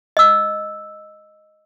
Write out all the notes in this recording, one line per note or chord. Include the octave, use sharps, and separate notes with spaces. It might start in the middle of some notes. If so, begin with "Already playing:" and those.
D#5 E6